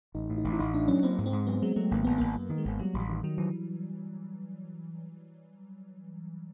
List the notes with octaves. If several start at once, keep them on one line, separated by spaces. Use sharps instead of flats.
A1 D#4
A2
D#4
A1
E4
A1 D#4
A2 D4
F#3 C#4
A#3 C4
G#2
C4
G#2
F#3 B3
F#3 G#3
F#3 A3
G#1 A#3
G#1 B3
G#1 A#3
F#2
D#3
G#3
G#1
F#3 G3
A1
D#3
D#3 F#3
E3 F#3